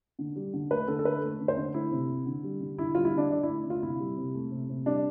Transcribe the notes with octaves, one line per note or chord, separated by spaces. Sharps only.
D3
G3
D3
A3 B4
D3 A4
A4
D3 B4
A3
D3
C5
D3
A3 E4
C3
C3
D3
G3
D3
D3 E4
G3 F4
E4
D3 D4
D3 D4
E4
A3
D3 F4
C3 E4
G3
C3
A3
C3
C3
G3 D4